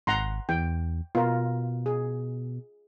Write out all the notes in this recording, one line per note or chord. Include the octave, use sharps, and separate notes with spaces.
G#1 F#5 A#5 C6
E2 G5
B2 F4 A#4
G#4